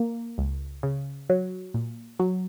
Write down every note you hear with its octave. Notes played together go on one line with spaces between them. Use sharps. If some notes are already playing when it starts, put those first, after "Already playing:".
Already playing: A#3
C#2
C#3
F#3
A#2
F#3